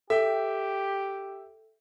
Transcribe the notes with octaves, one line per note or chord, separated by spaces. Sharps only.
G4 A4 E5 G5